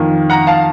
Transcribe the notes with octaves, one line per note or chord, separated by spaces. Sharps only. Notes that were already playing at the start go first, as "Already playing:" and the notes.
Already playing: F2 D#3 A#3
F#5 A#5
F5 A5